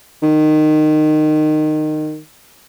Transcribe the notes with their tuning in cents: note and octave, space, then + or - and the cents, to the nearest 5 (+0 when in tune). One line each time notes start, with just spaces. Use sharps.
D#3 -20